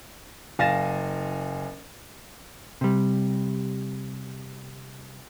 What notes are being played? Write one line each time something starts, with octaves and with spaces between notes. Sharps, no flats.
F#1 F5 G#5 A6 A#6 E7
C3 G3